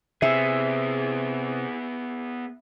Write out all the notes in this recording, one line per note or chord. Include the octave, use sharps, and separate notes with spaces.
C3 B3 G#4 E5